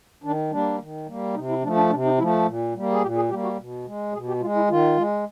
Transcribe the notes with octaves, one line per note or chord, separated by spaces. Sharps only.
D#3 D4
G3 A#3 D4
D#3
G3 A#3
C3 D#4
E4
F3 A3 D4
D4
C3 D4
D#4
F3 A3 E4
A#2
G3 A#3
G#4
A#2 G4
G#4
G3 A#3 G4
F#4
B2
G#3
B2 G#4
G4
G#3 F4
E4
D#3 F4
G#3